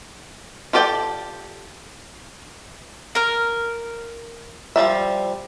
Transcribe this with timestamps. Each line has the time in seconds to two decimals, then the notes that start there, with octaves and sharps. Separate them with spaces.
0.73 F4 G4 A4 D5 G5
3.15 A#4 F6
4.76 F3 G3 E5